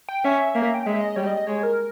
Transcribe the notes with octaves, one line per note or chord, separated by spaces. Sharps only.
G5
C#4 E5
A#3
G5
G#3 E5
D#5
G3 C#5
D#5
D#5
G#3 C#5
A#4